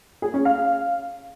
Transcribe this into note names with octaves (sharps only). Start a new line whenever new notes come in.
G#4
C#4
F5